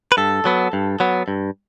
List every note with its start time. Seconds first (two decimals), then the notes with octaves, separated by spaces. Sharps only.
0.12 B4
0.17 G2 A4
0.45 F#3 B3
0.73 G2
1.00 F#3 B3
1.28 G2